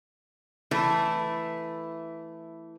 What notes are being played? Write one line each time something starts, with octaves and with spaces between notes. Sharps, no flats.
E3 A3 E4